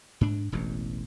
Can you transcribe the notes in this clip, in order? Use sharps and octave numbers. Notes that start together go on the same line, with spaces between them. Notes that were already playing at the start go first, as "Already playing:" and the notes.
G#2 D4
E1 A1 E2